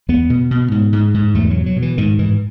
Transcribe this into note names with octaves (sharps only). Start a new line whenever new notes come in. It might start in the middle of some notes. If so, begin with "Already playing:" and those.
E2 B3
B2
B2
G#2
G#2
G#2
E2 A3
F#3
B2
F#3
B2
E3
G#2 D#3
G#2 E3